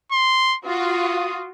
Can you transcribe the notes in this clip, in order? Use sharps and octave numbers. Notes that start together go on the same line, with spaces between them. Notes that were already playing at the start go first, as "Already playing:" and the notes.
C6
F4 F#4 D#6